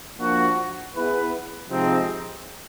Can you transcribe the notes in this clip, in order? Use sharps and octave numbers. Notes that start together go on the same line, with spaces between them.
F3 A#3 D4 F#4
B3 E4 G#4 B4
C3 F3 G#3 C4 D#4